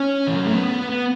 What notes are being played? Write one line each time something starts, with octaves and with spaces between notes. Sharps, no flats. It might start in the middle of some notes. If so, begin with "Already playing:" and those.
Already playing: C#4
E3
F#3
A3
B3
B3